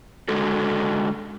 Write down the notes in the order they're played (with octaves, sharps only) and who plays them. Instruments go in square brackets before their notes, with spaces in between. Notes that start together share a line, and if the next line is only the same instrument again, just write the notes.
[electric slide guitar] D3 G#3 F#4 A4